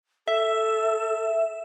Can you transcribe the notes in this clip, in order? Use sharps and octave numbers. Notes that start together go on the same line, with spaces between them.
A4 E5